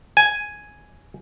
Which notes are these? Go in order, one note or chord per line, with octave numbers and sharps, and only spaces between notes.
G#5